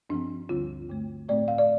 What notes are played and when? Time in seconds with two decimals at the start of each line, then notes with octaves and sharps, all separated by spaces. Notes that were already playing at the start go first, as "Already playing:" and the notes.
0.10 G2 F3 C4 D4
0.49 D2 D3 G3 C4 F4
0.89 G2 D3 A3
1.29 A2 A3 C4 D5
1.48 F5
1.58 D5